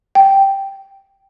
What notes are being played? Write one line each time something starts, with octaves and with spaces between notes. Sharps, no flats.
G5